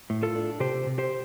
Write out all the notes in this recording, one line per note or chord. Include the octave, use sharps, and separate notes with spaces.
A2
F4 A4
D4
C3 G4 C5
C3
G4 C5